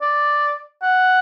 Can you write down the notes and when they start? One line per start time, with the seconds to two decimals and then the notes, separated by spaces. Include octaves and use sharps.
0.01 D5
0.82 F#5